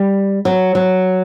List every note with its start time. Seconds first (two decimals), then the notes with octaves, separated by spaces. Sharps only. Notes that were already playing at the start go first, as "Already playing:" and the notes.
Already playing: G3
0.45 F#3
0.75 F#3